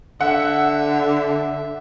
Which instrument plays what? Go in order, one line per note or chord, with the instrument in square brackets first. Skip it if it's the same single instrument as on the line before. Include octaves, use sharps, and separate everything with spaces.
[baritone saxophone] D3 [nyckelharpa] E5 [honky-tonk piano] F#5